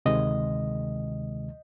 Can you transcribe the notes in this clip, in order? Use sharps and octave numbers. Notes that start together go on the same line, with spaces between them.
D2 C3 D#3 G#3 D#5